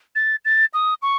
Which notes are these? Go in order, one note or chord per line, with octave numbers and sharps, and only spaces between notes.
A6
A6
D#6
C#6